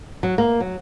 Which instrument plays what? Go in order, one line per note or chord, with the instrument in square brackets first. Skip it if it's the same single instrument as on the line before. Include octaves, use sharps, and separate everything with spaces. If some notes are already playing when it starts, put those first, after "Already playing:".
[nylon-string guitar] F#3
A#3
F#3